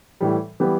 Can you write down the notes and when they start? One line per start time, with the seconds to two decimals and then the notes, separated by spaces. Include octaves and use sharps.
0.21 A2 E3 G3
0.60 E3 G3 B3 G4